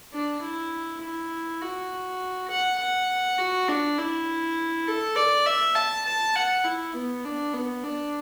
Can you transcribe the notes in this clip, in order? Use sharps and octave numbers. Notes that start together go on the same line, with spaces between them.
D4
E4
E4
F#4
F#5
F#5
F#4
D4
E4
A4
D5
E5
A5
A5
F#5
E4
B3
D4
B3
D4